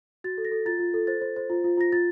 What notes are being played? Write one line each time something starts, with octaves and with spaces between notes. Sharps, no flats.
F#4 A6
A4
A#6
A4
F4 A6
F4
A4
C5 A6
C5
C5
F4
F4
F4 A#6
F4 A6